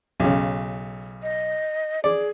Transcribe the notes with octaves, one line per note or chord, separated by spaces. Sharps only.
B1 C#3
D#5
G#4 D5